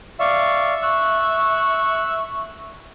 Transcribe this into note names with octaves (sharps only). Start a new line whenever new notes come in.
D5 E5 F5 C#6
C#6 E6 F#6